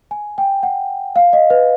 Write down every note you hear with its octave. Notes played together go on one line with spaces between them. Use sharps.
G#5
G5
F#5
F5
D#5
B4